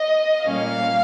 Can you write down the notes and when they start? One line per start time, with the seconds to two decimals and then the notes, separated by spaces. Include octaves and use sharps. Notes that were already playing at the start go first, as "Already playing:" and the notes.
Already playing: D#5
0.43 A#2 G3 A#3 C#4 F5